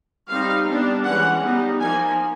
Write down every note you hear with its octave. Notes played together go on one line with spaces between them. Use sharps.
G3 C4 D#4 F5
G3 B3 D4
E3 G#3 C#4 F#5
G3 B3 D#4
F3 A#3 D#4 G#5